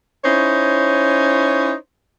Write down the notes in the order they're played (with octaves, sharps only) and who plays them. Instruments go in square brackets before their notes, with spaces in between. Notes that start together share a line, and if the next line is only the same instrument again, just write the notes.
[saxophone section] C#4 D#4 E4 C5 C#5